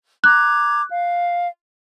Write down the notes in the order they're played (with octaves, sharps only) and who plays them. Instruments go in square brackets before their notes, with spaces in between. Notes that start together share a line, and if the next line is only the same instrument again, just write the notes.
[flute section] A#5 D6 G#6 [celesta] F#6
[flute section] F5